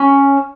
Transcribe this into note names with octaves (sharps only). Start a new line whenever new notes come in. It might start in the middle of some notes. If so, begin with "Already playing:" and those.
Already playing: C#4